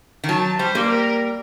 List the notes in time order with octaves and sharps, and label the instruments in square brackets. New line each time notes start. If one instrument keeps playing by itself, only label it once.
[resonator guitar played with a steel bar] D#3
[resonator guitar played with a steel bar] F#3 [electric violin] A5
[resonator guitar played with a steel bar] G3 [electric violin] C5
[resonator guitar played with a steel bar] G3 A#3
[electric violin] A#4